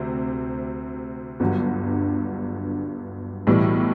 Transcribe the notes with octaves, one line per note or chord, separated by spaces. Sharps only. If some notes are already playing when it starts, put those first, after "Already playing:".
Already playing: D2 C3 C4
G1 G2 D3 F#3
B1 A2 E3 G3